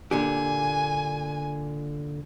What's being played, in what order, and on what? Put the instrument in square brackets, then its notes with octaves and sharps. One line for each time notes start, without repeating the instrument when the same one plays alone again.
[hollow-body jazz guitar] A#2 D3 G4 [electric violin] G#5